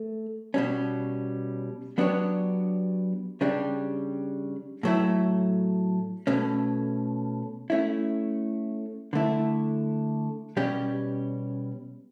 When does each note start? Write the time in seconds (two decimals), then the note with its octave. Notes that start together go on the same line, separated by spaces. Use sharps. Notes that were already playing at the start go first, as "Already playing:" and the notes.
Already playing: A3
0.54 B2 G3 C#4
1.98 F#3 B3 D4 G4 C#5
3.41 C#3 G3 D4 G4
4.83 A2 F#3 A3 E4
6.27 B2 A3 C#4
7.70 A3 C#4 E4
9.13 D3 A3 E4
10.57 B2 G3 C#4 G4